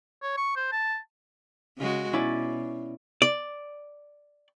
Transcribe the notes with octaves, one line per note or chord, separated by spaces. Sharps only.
C#5
C#6
C5
A5
C#3 G#3 F#4
B2 C#4 E4 D5
D5